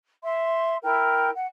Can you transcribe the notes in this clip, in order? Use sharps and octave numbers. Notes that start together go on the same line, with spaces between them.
E5 C6
E4 A#4 G5
F#5